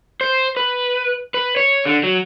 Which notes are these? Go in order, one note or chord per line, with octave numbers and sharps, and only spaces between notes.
C5
B4
B4
C#5
D3
F#3